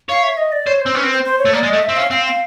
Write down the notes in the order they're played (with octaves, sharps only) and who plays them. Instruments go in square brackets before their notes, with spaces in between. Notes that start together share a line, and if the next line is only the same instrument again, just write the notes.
[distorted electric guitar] C#5 [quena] F5
[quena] E5
D#5
D5
[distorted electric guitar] C5 [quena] C#5
[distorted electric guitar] C4 [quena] C5
[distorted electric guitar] C#4 [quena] B4
[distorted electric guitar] C4
[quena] C5
C5
C#5
[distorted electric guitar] A3
[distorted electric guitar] A#3 [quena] D5
[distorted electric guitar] G#3
[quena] D#5
[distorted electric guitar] A3
[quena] E5
[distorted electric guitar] C4
[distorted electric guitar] C#4 [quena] F5
[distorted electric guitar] C4 [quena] F5
[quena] F5